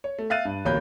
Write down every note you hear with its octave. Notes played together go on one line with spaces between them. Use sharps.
C#5
A3
E5 F5 F#6 A6 D#7
G2
D1 A1 A#3 C#4 B5 G6